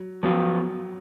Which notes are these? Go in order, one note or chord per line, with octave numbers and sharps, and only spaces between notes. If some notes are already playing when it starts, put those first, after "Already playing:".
Already playing: F#3
F3 F#3 B3 F4